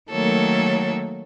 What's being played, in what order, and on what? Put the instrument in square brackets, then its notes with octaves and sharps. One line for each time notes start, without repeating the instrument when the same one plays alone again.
[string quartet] D#3 F#3 A3 A#3 A4 C#5